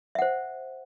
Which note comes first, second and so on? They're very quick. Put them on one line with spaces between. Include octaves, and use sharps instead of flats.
E5 F#5 C5